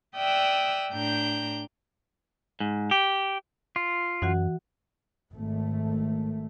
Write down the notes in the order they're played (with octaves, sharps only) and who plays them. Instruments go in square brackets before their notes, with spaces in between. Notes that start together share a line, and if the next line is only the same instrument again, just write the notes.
[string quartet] D5 E5 G5 D#6 E6 F#6
A2 D4 G5 A#5 G6
[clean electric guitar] G#2
G4
[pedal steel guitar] F4
[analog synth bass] F#2 [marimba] E3 F#4 F#5
[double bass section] G#1 A3